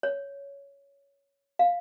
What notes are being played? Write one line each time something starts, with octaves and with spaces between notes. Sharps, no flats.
C#5
F5